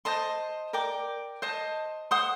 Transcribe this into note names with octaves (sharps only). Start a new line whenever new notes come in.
C5 D#5 A5 C6
A#4 D5 G5 D6
C5 D#5 A5
C5 F#5 C6 D#6